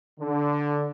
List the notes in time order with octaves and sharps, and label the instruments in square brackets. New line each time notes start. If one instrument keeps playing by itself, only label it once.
[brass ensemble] D3